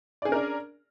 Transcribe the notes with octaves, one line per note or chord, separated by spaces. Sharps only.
C#4 D4 G#4 A#4 D5